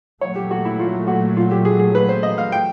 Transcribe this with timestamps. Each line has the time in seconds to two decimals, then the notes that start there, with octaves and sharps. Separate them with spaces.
0.21 A#2 F#3 A3 C#5
0.35 G4
0.51 F#4
0.65 E4
0.79 F4
1.07 F#4
1.37 F4
1.51 G4
1.65 G#4
1.79 G#4
1.95 B4
2.09 C5
2.23 D#5
2.38 F5
2.52 G5